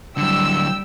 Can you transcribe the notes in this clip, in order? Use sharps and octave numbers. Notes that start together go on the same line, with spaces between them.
D3 F#3 G3 G5 E6